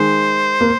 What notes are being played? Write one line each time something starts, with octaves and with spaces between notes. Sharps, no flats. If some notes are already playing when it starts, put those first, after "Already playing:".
Already playing: D#3 G#3 C5
A#3